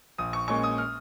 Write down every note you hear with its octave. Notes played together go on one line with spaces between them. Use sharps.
A#1 D#6
C#6
A#2 G#3 C#4 C#6
D#6
F6